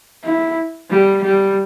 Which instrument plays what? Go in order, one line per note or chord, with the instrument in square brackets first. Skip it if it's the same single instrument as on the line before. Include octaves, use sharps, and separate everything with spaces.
[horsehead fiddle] E4
G3
G3